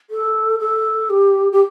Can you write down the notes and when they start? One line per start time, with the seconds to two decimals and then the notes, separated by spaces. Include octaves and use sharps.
0.10 A4
0.60 A4
1.10 G4
1.52 G4